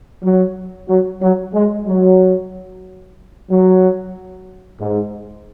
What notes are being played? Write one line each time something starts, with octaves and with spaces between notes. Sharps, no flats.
F#3
F#3
F#3
G#3
F#3
F#3
G#2